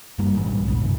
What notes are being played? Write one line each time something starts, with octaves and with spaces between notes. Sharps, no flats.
F#1 G2 G3 A#3
G#2 C3 E3
B1 A#2 G3 G#3
E2 G#2 C#3
F#2 A2 C3 E3